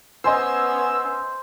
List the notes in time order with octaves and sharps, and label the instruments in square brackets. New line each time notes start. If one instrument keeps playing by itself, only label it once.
[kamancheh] B3 C#4 [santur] C5 [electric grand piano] D#5 G#5 C6 [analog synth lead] E6